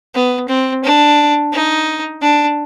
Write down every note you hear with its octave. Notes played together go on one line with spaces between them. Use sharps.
B3
C4
D4
D#4
D4